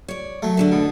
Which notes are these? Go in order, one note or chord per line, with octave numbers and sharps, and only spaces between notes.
C#5 D5
F#3 A3
D3 D4 A4
B2